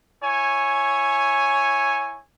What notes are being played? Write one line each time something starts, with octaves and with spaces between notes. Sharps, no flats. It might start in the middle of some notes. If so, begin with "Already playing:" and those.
E4 C#5 G#5